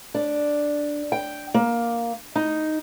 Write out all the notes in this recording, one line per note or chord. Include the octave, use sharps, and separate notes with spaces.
D4
G5
A#3
D#4